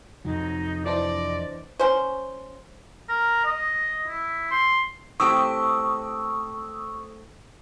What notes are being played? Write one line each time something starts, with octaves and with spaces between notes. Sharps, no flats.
F2 C3 F#3 D#4
E3 D4 C5 D5 D#5
C#4 C5
A#4
D#5
E4
C6
A2 C4 G4 C#6 D#6 E6